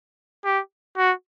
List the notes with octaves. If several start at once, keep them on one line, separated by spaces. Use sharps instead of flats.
G4
F#4